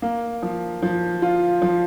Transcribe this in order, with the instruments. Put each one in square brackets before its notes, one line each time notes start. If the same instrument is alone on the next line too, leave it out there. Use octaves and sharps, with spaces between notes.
[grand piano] A#3
F3
F3
F4
F3